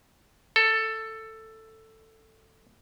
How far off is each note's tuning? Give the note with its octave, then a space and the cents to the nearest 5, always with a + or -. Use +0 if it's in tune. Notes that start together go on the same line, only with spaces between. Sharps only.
A4 +10